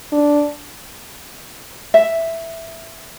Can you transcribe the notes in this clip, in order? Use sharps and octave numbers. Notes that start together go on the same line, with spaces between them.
D4
E5